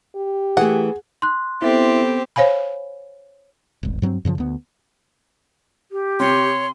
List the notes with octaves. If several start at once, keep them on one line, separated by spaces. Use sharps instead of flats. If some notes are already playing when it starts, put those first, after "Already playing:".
G4
E3 A3 G#4 F#5
C6 F#6
B3 C4 E4 G4 A4 E5
C5 C#5 F5 G#5 B5
D#1 G#1
G2 F#3 B3 C4
F#2 C#3 E3 F3
D2 B3
G4
C3 C#5 C6